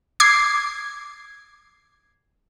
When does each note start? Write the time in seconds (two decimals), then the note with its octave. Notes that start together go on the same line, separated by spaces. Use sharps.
0.20 D6 G#6 C7